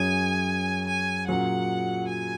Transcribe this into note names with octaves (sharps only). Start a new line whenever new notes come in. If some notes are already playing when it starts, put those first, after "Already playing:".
Already playing: F#2 F#3 C#4 G#4 C#5 G#5
G#5
A#2 F#3 C#4 G#4 F#5
G#5